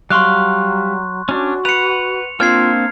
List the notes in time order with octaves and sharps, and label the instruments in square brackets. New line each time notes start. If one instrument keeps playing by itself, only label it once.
[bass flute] F#3 [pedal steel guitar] G3 F5 [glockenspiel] C6 C#6 F#6
[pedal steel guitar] C#4 D4 [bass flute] F#4
[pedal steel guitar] B4 F#5 [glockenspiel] C#7 F7
[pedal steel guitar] A#3 C4 D4 [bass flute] F4 [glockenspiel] F6 G#6 C7